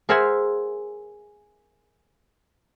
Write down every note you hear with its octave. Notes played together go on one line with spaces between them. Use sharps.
G#4 A#4 C5 E5 F#5 G#5